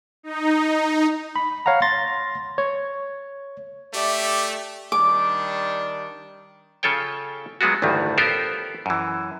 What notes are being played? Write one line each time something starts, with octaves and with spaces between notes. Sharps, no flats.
D#4
B5
C#5 F5 F#5 A#5
C6 A6 A#6
C#5
A3 G4 D5 E5
D#3 G3 D4 D6
C#3 F4 A4 C#5 G5
F#3 G#3 B3 F4 F#4
A1 D2 G2 D#3 G3
B3 F4 G4 A4 A#4 C5
F#2 E3